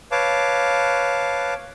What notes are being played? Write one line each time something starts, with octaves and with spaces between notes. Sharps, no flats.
B4 C#5 F5 A5 D6